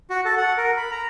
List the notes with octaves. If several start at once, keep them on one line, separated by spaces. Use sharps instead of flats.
F#4
A4
F#5
A#4
B5
A#5